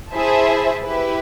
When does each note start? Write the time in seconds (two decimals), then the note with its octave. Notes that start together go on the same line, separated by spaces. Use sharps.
0.13 E4 G#4 C5 E5 A5
0.84 E4 G4 B4